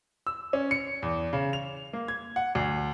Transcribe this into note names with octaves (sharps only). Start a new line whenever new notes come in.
E6
C#4
C#7
E2
C#3
F7
A#3
G#6
F#5
D2